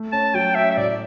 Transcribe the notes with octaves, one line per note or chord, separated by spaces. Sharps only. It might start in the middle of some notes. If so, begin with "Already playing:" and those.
Already playing: A3
C#4 A5
F#3 G5
C#4 E5
E5
A2 D5